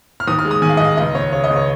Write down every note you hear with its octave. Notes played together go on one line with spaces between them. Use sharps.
F6
D#2 D#6
F6
G#3
D#6
D#3 G#5
F5
D#5
D#2 F5
C#2 D#5
C#2 C#5
C#3 C#5
D#5
C#2
C#5